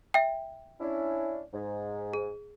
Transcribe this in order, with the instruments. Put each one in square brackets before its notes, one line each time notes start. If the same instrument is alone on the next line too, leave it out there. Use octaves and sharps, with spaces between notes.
[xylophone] E5 G5
[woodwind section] C#4 D4 E4
G#2
[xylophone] G#4